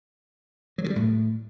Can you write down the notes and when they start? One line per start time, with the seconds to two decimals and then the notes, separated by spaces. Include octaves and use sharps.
0.78 F#3
0.84 D#3
0.90 G3
0.96 A2